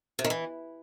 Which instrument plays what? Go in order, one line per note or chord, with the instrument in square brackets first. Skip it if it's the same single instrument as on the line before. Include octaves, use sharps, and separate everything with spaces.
[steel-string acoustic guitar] C3
D#3
E3